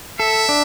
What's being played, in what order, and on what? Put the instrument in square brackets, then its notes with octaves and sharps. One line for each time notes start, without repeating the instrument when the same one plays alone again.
[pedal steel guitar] A4 [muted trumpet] E5
[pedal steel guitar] D4